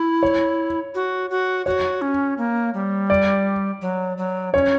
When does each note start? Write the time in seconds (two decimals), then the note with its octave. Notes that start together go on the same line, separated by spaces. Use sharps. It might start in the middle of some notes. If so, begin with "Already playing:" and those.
Already playing: E4
0.23 C#5
0.95 F#4
1.30 F#4
1.66 F#4 C#5
2.02 C#4
2.38 A#3
2.74 G3
3.10 D5
3.82 F#3
4.17 F#3
4.54 C#4 C#5